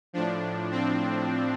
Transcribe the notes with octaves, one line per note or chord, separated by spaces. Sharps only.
A2 F3 D4
C4